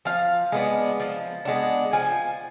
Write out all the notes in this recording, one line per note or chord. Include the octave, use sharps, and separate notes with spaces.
F3 F5
G#3 B3 D4
F3
G#3 B3 D4
F3 G#5